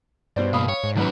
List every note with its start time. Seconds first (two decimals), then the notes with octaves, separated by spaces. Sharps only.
0.36 G2 B2 C5 D5
0.53 B2 A#3 F5 B5 D#6
0.69 C#5
0.83 G#2
0.97 D#2 F#3 C#4 B4